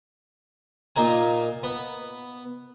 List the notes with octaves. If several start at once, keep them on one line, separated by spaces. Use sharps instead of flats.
A#2 D#4 A#4 G#5
B3